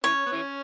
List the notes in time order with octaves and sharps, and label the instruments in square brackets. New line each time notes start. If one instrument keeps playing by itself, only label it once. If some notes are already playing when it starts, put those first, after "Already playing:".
[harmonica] E3 C#4 [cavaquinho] C#5
[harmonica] B3
E3 C#4